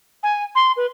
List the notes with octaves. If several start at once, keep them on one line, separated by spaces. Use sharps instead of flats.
G#5
C6
B4